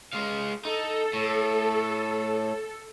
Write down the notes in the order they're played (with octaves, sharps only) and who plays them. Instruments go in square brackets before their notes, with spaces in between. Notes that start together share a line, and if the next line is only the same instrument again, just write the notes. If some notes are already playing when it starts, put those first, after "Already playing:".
[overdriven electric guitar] G#3 F5
[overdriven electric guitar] D#4 [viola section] A4
[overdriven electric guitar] A2